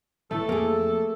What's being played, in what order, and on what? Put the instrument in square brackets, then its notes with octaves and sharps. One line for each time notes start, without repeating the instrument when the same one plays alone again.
[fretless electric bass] G1 A2 E3 [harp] A3 [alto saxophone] A4
[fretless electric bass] F2 [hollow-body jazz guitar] A#3 G#4